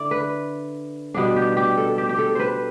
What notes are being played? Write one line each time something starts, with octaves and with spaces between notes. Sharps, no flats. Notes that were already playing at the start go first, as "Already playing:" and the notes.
Already playing: D3 E4 D5
B4
B2 G3 B3 D4
G4
G4
A4
G4
G4
A4
B4 C5